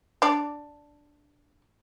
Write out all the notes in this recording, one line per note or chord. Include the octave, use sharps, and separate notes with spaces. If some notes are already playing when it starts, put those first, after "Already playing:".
D4 D5